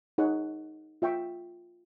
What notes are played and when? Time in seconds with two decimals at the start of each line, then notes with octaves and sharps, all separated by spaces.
0.18 D#4 G#4 C#5 F#5
1.02 F4 E5 G5 C#6